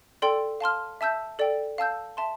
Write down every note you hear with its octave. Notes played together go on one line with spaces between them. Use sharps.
A4 D5 G5 C6 E6
F5 A5 C6 F6
E5 A5 E6 G6
A4 D5 G5
F5 A5 E6 G6
E5 A5 C6